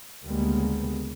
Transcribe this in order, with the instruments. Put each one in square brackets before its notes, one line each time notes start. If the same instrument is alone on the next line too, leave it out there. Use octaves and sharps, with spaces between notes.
[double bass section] D2 C#3 G3 G#3 A#3 B3